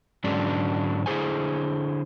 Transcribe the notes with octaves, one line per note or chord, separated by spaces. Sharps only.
G#2 D3 F#3 G#3 C#4 D4
D3 E4 G#4 C5 G#5